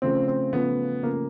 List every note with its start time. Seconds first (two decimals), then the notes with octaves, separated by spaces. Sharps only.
0.02 C#3 F3 A3 C4 C#4
0.27 C4
0.52 C#3 F3 A3 B3 C#4
1.02 C#3 F3 A3 A#3 C#4